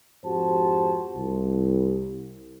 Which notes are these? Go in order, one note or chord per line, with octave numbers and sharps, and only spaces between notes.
F2 G#2 F#4 G4 C5 A5
C2